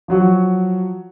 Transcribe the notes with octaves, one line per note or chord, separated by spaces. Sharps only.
F3 F#3 F#4